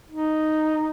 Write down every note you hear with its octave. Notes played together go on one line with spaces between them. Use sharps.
D#4